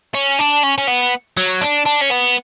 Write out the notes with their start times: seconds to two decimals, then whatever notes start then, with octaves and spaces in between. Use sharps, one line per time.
0.15 C#4
0.39 D4
0.64 C#4
0.78 C#4
0.88 B3
1.37 F#3
1.61 D4
1.86 D4
2.02 C#4
2.11 B3